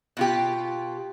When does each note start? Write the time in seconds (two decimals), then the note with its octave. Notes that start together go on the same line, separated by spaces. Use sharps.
0.17 B2 F4 G4